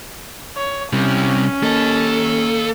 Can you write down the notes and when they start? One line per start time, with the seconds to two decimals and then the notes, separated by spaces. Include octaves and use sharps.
0.56 C#5
0.93 C3 G3 C#4
1.63 A#3 A4 D#5